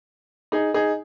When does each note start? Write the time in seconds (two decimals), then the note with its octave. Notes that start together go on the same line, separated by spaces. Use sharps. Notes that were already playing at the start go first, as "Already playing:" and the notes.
0.52 D#4 G#4
0.74 D#4 G#4